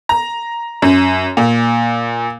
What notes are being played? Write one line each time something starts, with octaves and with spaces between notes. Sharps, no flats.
A#5
F#2
A#2